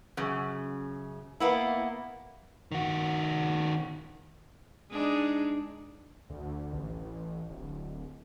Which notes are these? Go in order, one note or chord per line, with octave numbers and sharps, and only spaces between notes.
F#2 C#3
A#3 B3 E4
D#3 F#4
G#3 D4 D#4
D2
A1
D1